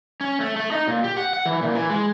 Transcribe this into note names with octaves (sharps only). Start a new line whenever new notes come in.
C#4
A3
A3
D#4
A#2
G4
F#5
F#5
E3
A#2
E3
G#3